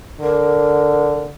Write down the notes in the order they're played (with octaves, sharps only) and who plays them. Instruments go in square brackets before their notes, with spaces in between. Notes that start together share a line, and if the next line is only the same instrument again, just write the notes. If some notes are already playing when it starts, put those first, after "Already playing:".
[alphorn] D3 [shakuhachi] A#4